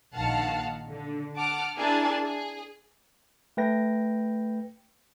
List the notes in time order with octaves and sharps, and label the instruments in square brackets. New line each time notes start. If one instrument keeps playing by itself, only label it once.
[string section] A#1 D#3 F5 F#5 A5
D3
F#5 A5 D6 F6
D4 E4 G#4 A#4 G#5 A5
G#4
[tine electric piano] A3 B4 G5 A#6